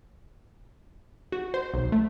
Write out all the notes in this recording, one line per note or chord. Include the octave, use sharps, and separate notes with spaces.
F#4
C5
B1
A3